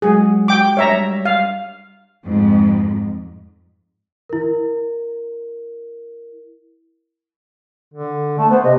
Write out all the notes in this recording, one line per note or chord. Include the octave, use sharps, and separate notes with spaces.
F#3 G#3 F#4 G#4
F#4 G4 G5 D6
G3 D4 C#5 E5 A#5
F5
F2 G#2
E4 A#4
D3
A3 A5
B3 C5
C3 D#5